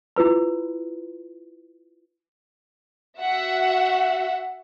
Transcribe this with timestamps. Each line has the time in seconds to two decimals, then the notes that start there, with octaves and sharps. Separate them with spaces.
0.16 E4 F4 B4 B5
3.20 F#4 E5 F#5